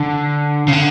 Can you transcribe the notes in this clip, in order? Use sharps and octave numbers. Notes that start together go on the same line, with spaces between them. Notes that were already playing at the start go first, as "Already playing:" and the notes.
Already playing: D3
C#3
D3